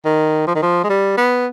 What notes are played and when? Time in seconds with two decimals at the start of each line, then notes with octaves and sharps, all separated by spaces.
0.05 D#3
0.47 F3
0.55 D#3
0.63 F3
0.84 G#3
0.90 G3
1.17 B3